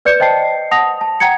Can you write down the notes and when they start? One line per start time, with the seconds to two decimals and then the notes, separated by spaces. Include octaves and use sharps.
0.05 B4 D5 G6 C#7
0.20 C5 D#5 G5 A5 C7
0.71 F#5 A5 D#6 A#6 F7
1.01 A5
1.20 F#5 G5 A#5 G#6 C#7